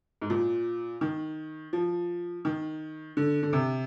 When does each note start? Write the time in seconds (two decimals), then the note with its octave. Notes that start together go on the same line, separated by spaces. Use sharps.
0.22 G#2
0.30 A#2
1.01 D#3
1.73 F3
2.45 D#3
3.17 D3
3.43 D3
3.53 C3